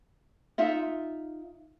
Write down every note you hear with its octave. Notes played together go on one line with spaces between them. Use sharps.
D#4 F4 E5